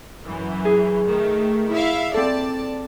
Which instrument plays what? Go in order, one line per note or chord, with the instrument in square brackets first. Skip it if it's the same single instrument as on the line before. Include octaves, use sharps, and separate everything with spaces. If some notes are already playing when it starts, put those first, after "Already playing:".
[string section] F#2 E3
[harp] G#4
[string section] D#3 A3
E4 E5 F5
[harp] C4 A4 [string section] D5 A5